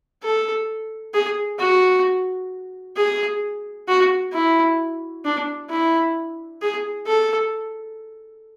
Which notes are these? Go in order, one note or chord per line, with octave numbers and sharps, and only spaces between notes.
A4
G#4
F#4
G#4
F#4
E4
D4
E4
G#4
A4